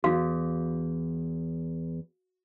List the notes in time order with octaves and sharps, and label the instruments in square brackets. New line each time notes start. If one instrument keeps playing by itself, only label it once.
[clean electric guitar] E2 [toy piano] F#4 F5